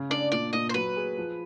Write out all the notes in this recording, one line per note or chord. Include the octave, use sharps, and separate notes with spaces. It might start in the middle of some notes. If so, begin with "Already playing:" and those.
Already playing: C#3
D4 D5
A#2 D5
A#2 D#5
C5
F#3 B4
G#4
F3